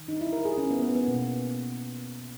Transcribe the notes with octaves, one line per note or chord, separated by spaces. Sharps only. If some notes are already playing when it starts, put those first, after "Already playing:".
Already playing: D#3
D#4
E4
A#4
G#4
C#4
B3
B3
B3
B2 A#3